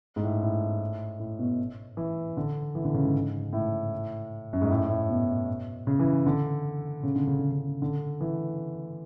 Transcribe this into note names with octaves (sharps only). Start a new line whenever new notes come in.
G#2
A2
A2
A2
B2
E3
D3
E3
D3
C#3
G#2
A2
F#2
G#2
A2
A2
B2
C#3
E3
D3
C#3
D3
C#3
D3
C#3
D3
E3